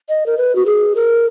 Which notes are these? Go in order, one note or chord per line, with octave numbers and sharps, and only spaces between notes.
D#5
A#4
B4
F#4
G#4
A#4